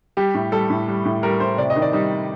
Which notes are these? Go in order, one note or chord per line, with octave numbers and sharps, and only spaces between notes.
G3 G4
A2
G3 A4
A2
G3
A2
G3 A#4
A2 C5
C3 D5
D#5
D#3
D5
G3 D#4